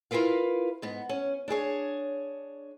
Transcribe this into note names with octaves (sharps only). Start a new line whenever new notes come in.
E4 F4 G#4 A#4 B4 F5
G#2 B3
C#4
D4 E4 G#4 C#5